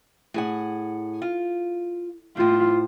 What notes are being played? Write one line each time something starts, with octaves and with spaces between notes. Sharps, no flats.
A2 G#4 F#5
F4
A2 F4 C5